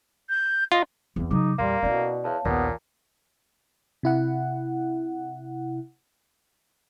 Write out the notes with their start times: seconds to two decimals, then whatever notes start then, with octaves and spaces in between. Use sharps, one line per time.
0.29 G6
0.72 F4 D#5
1.16 E2 C4
1.31 C#3 F#3 D#4 D6
1.58 E2 A#2 G3 A#3 F5 C6
1.83 B2 C#4 E4 D5
2.24 E2 C#5 F5 A5
2.45 A#1 D#2 A#2 B3
4.03 C3 E4 F#5